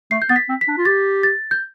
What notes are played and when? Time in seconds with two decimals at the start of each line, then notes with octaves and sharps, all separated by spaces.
0.11 A3 C7
0.22 G6
0.29 B3 A6
0.36 B6
0.49 C4
0.61 B6
0.68 D4
0.78 F4
0.85 G4 A6
1.23 A6
1.51 G6